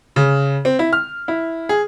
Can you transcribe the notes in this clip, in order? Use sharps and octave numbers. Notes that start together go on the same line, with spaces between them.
C#3
C4
E4
F6
E4
G#4